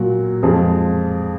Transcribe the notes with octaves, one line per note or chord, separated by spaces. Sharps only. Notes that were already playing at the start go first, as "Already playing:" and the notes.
Already playing: A#2 F#3 F#4
F2 F3 G#3 G#4